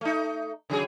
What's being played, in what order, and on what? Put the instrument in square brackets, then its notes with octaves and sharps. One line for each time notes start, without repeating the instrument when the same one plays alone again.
[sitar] A3 D#4
C#3 F#3 G#4